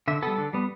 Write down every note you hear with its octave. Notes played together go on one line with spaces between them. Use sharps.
D3 E5
G3 B3 A4
D3
G3 B3